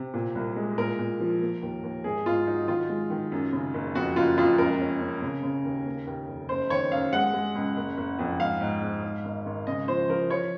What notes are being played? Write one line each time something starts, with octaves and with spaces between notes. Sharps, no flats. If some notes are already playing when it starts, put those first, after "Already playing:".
Already playing: C3
A#2
C2
G#3
A#2 A#4
A#2
F3
A#3
D#2
D#2
G#1 G#4
G#2 F4
F#3 D#4
D#3 F4
G#3
D#3
F#2
C#3
F#1
F2 F#4
F#1 F4
F2 F4
C#2 A#4
C#4
C#4
C#3
C#3
D#2
A#3
D#2
F1
F#1 C5
D#3 C#5
F#2 F5
G#3 F#5
G#3
C#2
F#1
F#1
F2
G#2 F5
G#2
G#2
G#2
G#1
G#1
C#3 D#5
F3 C5
F3 A#4
F3 C#5